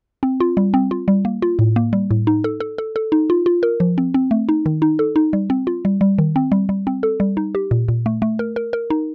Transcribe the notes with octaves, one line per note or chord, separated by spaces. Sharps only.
C4
F4
G3
C4
F4
G3
A#3
F4
A2
A#3
G3
A2
D#4
A4
A4
A4
A4
D#4
F4
F4
A#4
F3
C4
C4
A3
D#4
D#3
D#4
A4
D#4
G3
C4
F4
G3
G3
D#3
C4
G3
G3
C4
A4
G3
D#4
G4
A#2
A#2
A3
A3
A#4
A#4
A#4
D#4